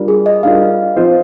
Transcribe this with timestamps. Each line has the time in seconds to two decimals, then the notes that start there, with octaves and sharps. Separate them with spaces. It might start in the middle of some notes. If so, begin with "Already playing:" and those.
Already playing: G3 D4 F4 A#4
0.08 G#4
0.26 D#5
0.43 G3 D4 F4 A#4 F5
0.96 F3 C4 F4 C5 D#5